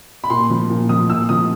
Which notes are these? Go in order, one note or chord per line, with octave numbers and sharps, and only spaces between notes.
B5
A#2 C6
F3
A#2
F3 D#6
A#2 E6
F3 D#6